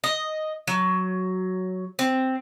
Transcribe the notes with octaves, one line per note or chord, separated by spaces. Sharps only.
D#5
F#3
C4